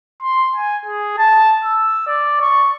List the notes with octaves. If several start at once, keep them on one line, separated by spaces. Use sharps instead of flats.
C6
G#5
G#4
A5
E6
D5
C#6